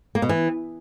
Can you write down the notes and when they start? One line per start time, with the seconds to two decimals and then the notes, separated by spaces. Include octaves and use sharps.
0.15 A#3
0.22 B2
0.29 E3